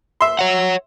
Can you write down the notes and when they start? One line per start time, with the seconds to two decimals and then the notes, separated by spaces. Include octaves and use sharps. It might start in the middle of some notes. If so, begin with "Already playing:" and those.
0.21 E5 C6
0.39 C#5 F#5